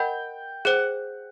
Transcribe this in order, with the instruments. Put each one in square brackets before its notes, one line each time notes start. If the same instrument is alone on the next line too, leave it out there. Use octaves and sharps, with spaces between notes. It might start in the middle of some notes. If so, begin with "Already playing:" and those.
Already playing: [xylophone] A#4 D#5 F#5 B5 [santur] G5
[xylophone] G#4 C5 [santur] F#5